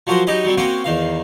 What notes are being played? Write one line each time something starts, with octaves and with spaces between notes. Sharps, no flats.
F3 F#3 F#4 A#4 C5
F#3 D#4 G4 D#5 G#5 B5
F#3 G3 C4
A#3 C4 C#4 F#4 G5 G#5
E2 D#3 F5